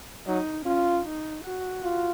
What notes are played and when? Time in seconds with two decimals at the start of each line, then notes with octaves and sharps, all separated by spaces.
0.27 F#3 D#4
0.66 C#4 F4
1.05 D#4
1.45 F#4
1.83 F4